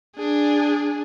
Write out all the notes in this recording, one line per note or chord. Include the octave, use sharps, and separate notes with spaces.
D4 G#4